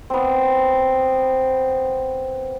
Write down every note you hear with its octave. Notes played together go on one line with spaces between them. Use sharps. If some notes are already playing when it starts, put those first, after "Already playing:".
B3 C4